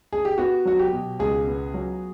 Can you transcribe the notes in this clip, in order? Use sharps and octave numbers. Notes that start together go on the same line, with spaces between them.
G#4
G4
B3 F#4
F#3 F#4
G4
B2
C#2 G#4
B3
F#3